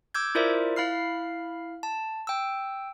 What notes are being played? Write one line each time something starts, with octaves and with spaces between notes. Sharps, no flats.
D6 E6 G6 G#6
E4 F4 A#4 C5 D5 E5
E4 F5 B5 F6 C7
A5
G5 E6